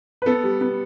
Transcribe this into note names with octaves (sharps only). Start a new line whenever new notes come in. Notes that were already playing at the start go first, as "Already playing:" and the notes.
B4
B3 A4
G3
B3